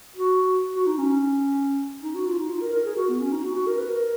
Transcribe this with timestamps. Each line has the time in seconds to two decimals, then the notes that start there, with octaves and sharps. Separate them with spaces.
0.16 F#4
0.75 F#4
0.87 D#4
0.98 C#4
2.03 D#4
2.15 F#4
2.26 F4
2.38 D#4
2.50 F4
2.62 A#4
2.73 A#4
2.85 G#4
2.97 F#4
3.09 B3
3.20 C#4
3.32 D#4
3.44 F#4
3.55 F#4
3.67 A#4
3.78 B4
3.90 A#4